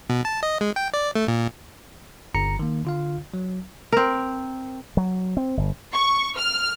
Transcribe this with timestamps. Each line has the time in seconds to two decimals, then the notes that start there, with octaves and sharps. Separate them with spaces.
0.10 B2
0.25 A5
0.43 D#5
0.61 G#3
0.76 G5
0.94 D5
1.15 A3
1.28 A#2
2.34 G1 A#5 C#7
2.59 D#3 A#3
2.85 D3 F4 F5
3.34 F#3
3.92 C4 A#4
4.97 F#3
5.37 C4
5.57 G1
5.94 C#6
6.38 F6